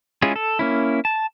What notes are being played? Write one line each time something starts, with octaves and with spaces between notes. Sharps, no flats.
G#3 C#4 E4 F4 G#4
A4
A#3 C#4 E4
A5